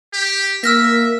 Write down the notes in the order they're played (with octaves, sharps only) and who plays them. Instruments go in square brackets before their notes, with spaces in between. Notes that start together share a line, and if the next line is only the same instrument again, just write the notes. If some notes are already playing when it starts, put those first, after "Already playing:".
[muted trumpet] G4
[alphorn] A#3 [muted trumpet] E5 [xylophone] E6 F6 A#6